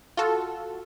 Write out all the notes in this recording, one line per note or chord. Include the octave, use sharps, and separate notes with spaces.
F4 F#4 A4